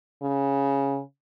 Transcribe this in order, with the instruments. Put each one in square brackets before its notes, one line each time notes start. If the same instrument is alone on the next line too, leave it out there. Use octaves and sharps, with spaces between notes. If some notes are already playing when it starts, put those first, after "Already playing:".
[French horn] C#3